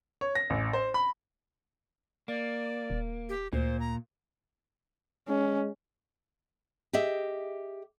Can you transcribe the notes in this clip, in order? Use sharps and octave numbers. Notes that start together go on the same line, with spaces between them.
C#5
A#6
A1
C5
B5
A#3 D5
D#1
G4
D2 A#2 C5
A#5
G#3 C#4
G4 G#4 D#5 E5